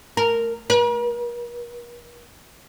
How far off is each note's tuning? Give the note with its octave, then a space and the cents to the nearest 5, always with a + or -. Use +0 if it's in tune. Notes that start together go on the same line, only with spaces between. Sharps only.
A#4 -10
A#4 +45